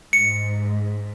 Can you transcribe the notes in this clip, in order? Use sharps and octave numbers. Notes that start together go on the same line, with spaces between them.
G#2 C#7